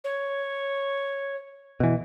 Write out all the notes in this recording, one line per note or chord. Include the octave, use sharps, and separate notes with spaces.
C#5
B2 E3